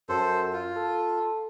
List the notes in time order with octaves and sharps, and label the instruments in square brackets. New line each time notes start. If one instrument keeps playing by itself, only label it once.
[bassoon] F#2 [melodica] A4 C5
[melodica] F4
[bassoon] A4